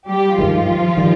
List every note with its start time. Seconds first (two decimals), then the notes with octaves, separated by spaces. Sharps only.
0.09 G3 G4
0.38 G2 D#3 F3 G#3 F4
0.97 D#3 G3